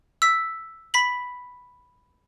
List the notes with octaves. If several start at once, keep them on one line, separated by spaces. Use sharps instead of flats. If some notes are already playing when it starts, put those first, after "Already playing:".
E6 B6
B5 B6 F#7